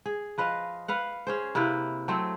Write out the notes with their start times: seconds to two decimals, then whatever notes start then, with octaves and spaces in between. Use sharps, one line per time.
0.06 G#4
0.38 F3 B4 D#5 F5
0.88 B4 F5 F#5
1.27 C#4 G#4 C5
1.55 C3 A#3 E4 B4
2.08 F#3 A3 C4